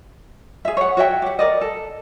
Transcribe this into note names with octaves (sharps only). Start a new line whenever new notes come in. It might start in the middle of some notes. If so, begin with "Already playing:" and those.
G#4 E5
C#5 F#5
F#4 C#5 E5 G5
G4 F#5
A#4 D5 D#5
A4